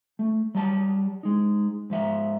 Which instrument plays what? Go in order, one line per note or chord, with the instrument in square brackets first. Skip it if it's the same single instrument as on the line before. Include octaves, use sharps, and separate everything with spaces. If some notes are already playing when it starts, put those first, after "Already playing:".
[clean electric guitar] A3
F#3 G3 A5
G#3 D#4
G#2 F3 E5